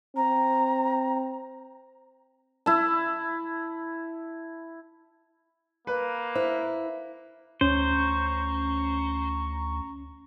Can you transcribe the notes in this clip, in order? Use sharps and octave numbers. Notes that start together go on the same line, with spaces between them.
C4 A#5
E4 A5
A#3 B4
E4 C5
D2 C#4 C5 A#5 C#6